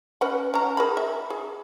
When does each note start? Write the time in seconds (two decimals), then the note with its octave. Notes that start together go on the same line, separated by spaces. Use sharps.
0.21 C#4 B4 F#5
0.54 C#4 A#5
0.77 G#4 A#4 B5
0.97 E5
1.30 G#4